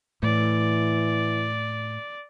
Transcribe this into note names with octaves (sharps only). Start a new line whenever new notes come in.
A2 E3 D5